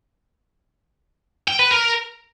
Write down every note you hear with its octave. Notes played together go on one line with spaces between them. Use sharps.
G5
B4
A#4